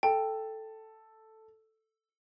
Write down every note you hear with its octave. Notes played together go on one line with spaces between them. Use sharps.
A4 G5